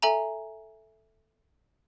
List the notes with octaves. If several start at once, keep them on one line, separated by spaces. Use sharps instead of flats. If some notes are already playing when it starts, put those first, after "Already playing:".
A4 E5 G#5 A#5